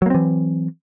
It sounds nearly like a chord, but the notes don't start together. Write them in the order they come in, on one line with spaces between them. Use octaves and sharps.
F#3 A#3 C4 E3